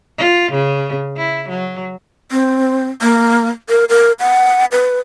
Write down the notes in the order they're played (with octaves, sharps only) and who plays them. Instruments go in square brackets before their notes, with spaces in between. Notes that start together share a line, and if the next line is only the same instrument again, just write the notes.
[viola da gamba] F4
C#3
E4
F#3
[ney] C4
A#3
A#4
A#4
F#5
B4